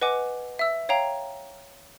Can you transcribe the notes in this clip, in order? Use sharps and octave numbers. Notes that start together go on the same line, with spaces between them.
B4 D#5 F#5 G#5 D6
E5 E6
C#5 F5 G5 A#5